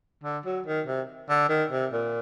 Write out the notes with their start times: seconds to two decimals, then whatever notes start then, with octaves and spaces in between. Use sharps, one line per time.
0.24 D3
0.46 F#3
0.66 D#3
0.87 C3
1.30 D3
1.49 D#3
1.71 C3
1.92 A#2